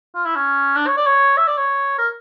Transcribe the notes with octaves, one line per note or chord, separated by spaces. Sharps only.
F4
E4
C#4
D4
C#5
D5
C#5
E5
D5
C#5
A#4